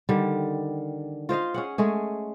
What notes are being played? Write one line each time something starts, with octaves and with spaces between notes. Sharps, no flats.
D3 D#3 G3
F4 C5 D#5 F5
C#4 G#4 F#5
G#3 A3 G#4